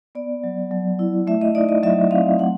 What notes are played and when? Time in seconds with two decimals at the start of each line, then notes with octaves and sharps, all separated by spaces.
0.15 B3 D5
0.44 F#3
0.71 F#3
0.99 E4
1.27 A3 E5
1.41 D#5
1.55 D#4 D5
1.69 D#5
1.83 F#3 E5
2.11 C4 F5
2.39 A3 F#5